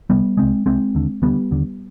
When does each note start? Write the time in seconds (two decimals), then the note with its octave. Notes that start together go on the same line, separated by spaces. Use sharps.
0.10 C2 C3 G3 B3
0.37 C2 C3 G#3 C4
0.66 C2 C3 G#3 C4
0.95 D#2 D3
1.22 D#2 D3 G3 B3
1.51 D#2 D3